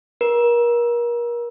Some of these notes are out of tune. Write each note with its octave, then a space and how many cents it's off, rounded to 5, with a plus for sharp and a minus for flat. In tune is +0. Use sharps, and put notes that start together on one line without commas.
A#4 +35